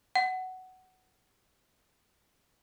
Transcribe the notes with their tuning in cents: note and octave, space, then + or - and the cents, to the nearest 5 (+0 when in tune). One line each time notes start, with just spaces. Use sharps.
F#5 +10